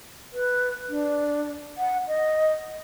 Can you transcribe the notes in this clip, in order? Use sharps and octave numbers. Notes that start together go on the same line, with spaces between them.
B4
D4
F#5
D#5